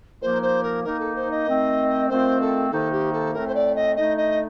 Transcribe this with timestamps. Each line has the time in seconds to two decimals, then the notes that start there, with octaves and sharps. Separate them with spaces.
0.21 A#2 F3 A#3 D#4 C5
0.42 C5
0.63 A#4
0.83 D#3 A#3 D#4 A#4
0.99 A4
1.15 C5
1.30 D#5
1.46 D#3 A3 C4 D#4
2.08 D#3 A3 C4 F4 C5
2.40 A4
2.70 C3 D#3 A#3 D#4 A4
2.92 G4
3.12 A4
3.33 A2 A3 C4 A#4
3.47 C5
3.54 D5
3.75 D#5
3.96 D3 A3 D#4 D#5
4.17 D#5